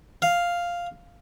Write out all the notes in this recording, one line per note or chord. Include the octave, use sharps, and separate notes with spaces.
F5